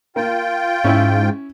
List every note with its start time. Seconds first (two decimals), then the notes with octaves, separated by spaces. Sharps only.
0.16 A#3 F4 G5
0.84 G#2 C#4 E4